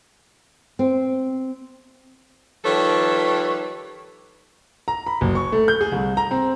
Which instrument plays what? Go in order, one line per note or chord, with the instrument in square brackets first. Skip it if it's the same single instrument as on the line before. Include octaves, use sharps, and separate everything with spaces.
[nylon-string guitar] C4
[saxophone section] D#3 F3 G3 A4 B4 C#5
[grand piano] A#5
B5
F#1
C#6
A3
G6
G#4
C2
A#5
C4